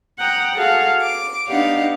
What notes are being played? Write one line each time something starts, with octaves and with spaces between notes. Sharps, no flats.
F#5 G5 A#5 D#6
F#4 G#4 A4 F5 F#5
D6
B3 D4 D#4 G4 F5 F#5